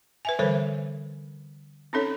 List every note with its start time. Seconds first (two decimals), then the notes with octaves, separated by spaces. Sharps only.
0.25 B4 E5 G#5
0.39 D3 E3 G3 A4 A#4 C5
1.93 C4 C#4 D#4 A4 C#5